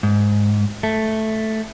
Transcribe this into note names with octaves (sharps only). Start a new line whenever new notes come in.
G#2
A3